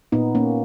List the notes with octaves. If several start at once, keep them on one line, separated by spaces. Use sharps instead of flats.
A#2 B3 D#4
A#3 C#4